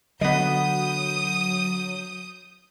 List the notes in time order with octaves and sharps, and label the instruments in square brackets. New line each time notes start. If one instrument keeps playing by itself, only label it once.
[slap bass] D3 [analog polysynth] F#3 [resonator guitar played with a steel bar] B3 D#5 [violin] D#6 G6